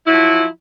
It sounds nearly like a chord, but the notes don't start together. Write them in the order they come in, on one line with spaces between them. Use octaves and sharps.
E4 F#3 F3